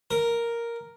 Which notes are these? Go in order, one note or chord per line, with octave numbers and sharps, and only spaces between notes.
A#4